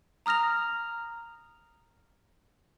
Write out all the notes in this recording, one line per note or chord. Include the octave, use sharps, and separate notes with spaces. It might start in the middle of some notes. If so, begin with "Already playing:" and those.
A#5 D#6 F6 A#6 F7